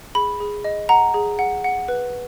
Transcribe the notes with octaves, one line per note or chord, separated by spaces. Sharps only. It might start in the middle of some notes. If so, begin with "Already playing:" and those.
G#4 B5
G#4
D#5
F#5 A#5
G#4
F#5
F#5
B4